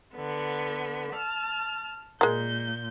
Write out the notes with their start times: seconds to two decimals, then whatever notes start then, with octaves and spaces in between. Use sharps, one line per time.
0.13 D3 B3
1.13 A5 F6
2.21 A#2 G#3 A#3 G6